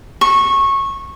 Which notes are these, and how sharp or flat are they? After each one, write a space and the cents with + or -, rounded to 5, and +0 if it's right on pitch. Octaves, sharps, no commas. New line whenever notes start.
C#6 -15